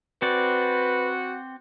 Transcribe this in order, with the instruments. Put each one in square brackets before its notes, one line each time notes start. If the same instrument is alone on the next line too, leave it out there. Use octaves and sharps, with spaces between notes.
[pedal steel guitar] C4 D5 [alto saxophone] F#4 [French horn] B4